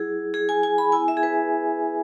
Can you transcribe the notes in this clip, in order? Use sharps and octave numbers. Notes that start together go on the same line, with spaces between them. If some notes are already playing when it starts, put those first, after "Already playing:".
Already playing: F#3 E4 G#4
G#4
G#5
G#5
B5
B3 E4 G#5
E5
G#4
B4